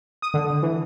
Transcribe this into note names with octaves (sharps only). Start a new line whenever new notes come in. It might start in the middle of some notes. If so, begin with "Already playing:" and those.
D#6
D3
E3